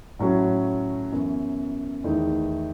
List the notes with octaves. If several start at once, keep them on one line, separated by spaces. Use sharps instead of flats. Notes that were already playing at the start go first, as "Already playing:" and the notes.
A2 F#3 A3 C#4 F#4
F#2 E3 B3 E4
E2 D#3 A3 D#4